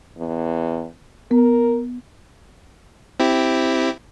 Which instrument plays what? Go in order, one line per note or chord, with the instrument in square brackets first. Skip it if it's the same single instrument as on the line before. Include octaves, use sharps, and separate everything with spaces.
[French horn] E2
[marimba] B3 [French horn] A#4
[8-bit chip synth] C4 E4 G4